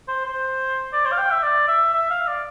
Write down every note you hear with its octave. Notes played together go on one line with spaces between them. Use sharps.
C5
C5
D5
C5
F5
G5
E5
D5
E5
E5
F5
D5